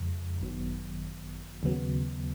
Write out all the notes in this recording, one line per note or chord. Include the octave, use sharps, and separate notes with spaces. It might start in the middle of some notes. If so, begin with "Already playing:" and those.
Already playing: F2 C#3 F3 G#3
G#1 F#2 D#3 F#3 B3
D#2 C#3 F#3 B3